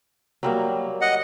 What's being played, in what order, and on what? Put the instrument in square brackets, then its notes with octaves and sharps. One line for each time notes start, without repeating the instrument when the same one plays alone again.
[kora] F#3 G3 A#3
[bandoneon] D#5 F#5